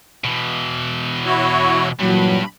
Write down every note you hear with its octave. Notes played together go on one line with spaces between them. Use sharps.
B2 E3
E4 F#4 C#5
G2 A#2 E3 F#3 B5